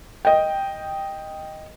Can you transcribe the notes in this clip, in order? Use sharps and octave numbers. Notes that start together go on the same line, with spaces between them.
D#5 G5